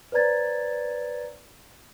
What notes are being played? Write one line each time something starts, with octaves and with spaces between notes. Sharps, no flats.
B4 C5 D5 A#5 G#6 A6